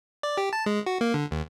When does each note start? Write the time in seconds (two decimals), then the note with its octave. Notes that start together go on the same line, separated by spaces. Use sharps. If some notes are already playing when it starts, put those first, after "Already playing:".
0.23 D5
0.37 G4
0.53 A5
0.66 G#3
0.86 F#4
1.01 A#3
1.14 D3
1.31 D#2